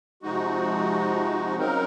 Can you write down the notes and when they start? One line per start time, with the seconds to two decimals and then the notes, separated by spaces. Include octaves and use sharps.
0.22 C3 F3 G#3 D#4 F#4
1.55 C#3 F#3 C4 D#4 A#4